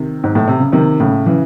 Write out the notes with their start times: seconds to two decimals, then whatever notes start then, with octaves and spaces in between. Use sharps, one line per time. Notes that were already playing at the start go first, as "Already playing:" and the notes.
Already playing: C3 D#3
0.24 G#2
0.35 A2
0.48 C3
0.60 C#3
0.72 C3 D#3
1.00 A2 C#3
1.26 C#3 E3